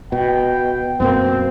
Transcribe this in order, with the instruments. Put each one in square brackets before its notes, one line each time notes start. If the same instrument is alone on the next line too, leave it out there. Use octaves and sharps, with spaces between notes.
[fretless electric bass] B2 [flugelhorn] G5
[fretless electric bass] F#2 B2 A#3 [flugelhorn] C4